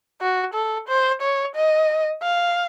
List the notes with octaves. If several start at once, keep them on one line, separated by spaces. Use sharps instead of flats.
F#4
A4
C5
C#5
D#5
F5